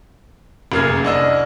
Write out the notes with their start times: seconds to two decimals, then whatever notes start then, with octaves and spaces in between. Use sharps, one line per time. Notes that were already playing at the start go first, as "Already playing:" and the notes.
0.72 F1 F#2 A#3 G#4 F6 G#6
1.03 C2 D4 D#5 E6